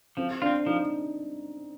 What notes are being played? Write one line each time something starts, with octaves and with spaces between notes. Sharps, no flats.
F3 C4
C4 D4 F4
F3 D#4